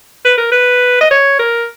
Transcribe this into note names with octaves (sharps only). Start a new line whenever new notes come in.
B4
A#4
B4
D#5
C#5
A#4